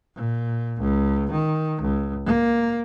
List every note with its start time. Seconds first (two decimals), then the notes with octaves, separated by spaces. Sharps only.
0.15 A#2
0.80 C#2
1.32 D#3
1.82 C#2
2.26 A#3